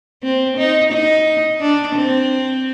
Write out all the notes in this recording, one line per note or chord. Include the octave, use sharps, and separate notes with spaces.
C4
D#4
D#4
D4
C4